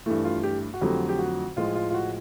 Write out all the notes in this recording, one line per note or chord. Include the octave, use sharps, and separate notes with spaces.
G2 E3 A3 E4
F4
G4
F#4
F2 D3 F#3 A3 G4
G4
F#4
A2 F3 G#3 F4
F4
F4
F#4